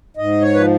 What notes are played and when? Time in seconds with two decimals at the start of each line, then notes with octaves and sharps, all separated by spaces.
0.17 G#2 D#5
0.41 C#5
0.54 F3 B4